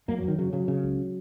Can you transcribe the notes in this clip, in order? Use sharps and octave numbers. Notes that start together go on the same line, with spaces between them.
F#2 A#3
F#2 F#3
D#3
C#3 F#3
C#3 F#3
C#3
C#2